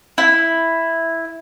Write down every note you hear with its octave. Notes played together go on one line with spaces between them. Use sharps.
E4